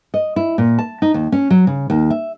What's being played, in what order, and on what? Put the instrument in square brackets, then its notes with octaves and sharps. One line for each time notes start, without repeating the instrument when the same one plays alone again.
[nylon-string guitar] D#5
E4
A#2
A5
D#4
D#2
C#4
F#3
C#3
D#2
E5